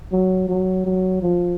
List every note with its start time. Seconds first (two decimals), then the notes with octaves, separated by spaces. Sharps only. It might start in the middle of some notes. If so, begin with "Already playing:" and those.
0.12 F#3
0.49 F#3
0.86 F#3
1.22 F3